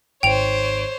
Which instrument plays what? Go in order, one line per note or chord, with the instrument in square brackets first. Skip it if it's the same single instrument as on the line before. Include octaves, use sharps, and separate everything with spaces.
[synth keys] G#1 G#2 D7 [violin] C5 C#5 [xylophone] G5 F7